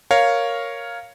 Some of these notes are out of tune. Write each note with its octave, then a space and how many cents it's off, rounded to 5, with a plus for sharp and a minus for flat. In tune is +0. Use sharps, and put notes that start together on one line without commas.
A#4 +0 C#5 +0 F5 +0